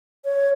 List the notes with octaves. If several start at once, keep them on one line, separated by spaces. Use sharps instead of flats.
C#5